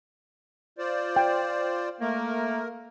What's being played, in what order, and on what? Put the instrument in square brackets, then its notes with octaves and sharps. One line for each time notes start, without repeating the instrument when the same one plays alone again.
[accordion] F4 C5 D5
[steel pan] G5
[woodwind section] A3 A#3 [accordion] A#4